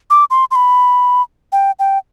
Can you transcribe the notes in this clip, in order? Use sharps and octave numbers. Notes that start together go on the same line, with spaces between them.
D6
C6
C6
B5
G5
G5